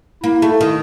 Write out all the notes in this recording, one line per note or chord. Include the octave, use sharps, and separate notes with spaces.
A#3 E4
A3
D#3